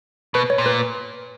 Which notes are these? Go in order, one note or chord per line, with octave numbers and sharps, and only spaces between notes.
B2 B4
C#5
A#2
B4